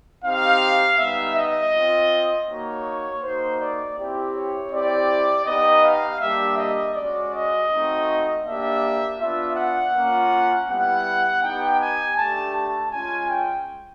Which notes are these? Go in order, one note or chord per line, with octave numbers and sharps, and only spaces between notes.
C4 D#4 G4 F5
G3 B3 D#4 E5
D#5
C4 F4
A#3 D#4 F#4 C#5
A#3 D#4 F#4 C5
D5
C4 E4 G4
C#5
C4 E4 G4 D5
B3 D#4 G4 D#5
F5
G3 A#3 D4 G4 E5
D#5
G#3 C#4 F#4 D5
D#5
A3 C4 D#4 F#4
A#3 D4 G4 E5
B3 D4 F4 E5
F#5
A#3 C#4 F4
G3 B3 E4 F#5
B3 D#4 G4 G5
G#5
A3 D4 G4 A5
A5
G#3 C#4 F4 G#5
G5